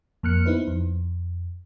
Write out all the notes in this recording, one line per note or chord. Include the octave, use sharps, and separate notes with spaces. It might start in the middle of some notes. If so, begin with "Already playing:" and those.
F2 A#3 F6 F#6 C#7
B3 D#4 E4 B4 C5
F2